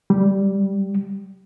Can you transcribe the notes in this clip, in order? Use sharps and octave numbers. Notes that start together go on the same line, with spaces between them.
G3